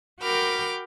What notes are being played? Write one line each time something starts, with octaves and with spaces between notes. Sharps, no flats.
F#4 A#4 G5 B5 D6 F6